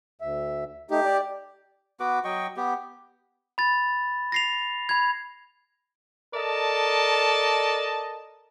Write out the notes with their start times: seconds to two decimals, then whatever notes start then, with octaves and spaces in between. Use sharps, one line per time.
0.21 D2 E5
0.91 A3 D#4 G4
1.05 D5
2.00 B3 F#4 B4 D6
2.24 F#3 D#5 G5 C#6
2.57 B3 G4
3.58 B5 A6
4.32 A#6 C7 F7
4.89 B5 G#6
6.34 A4 A#4 D5 D#5 A5